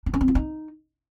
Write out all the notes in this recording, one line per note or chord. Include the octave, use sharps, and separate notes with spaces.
D4
C#4
C4
F4
D#4